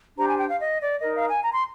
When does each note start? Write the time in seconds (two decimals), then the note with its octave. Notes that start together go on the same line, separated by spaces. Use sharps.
0.16 D4 G4 C5 A#5
0.27 G#5
0.37 G5
0.48 F5
0.58 D#5
0.79 D5
0.99 D#4 A#4 D#5
1.14 F5
1.28 G#5
1.42 A#5
1.52 C6